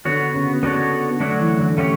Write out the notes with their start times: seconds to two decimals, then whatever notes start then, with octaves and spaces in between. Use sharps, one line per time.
0.05 D3 B3 F#4 C#5
0.34 C#3
0.63 B3 D4 F#4 A4 C#5
1.20 D3 F#3 A3 D4 F#4 C#5
1.40 E3
1.59 D3
1.78 A3 C#4 G4 C#5